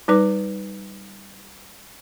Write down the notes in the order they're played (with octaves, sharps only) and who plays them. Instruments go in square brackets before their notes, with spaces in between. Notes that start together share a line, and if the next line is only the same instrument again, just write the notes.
[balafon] G3 D#4 B4 D6